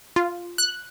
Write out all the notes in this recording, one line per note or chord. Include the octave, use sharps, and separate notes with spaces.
F4
F#6